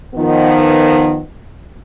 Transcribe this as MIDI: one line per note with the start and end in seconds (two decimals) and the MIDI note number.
0.15 1.20 51
0.15 1.20 53
0.15 1.20 59